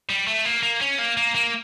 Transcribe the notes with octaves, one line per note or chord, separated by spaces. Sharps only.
G3
A3
A#3
A#3
C#4
A#3
A#3
A#3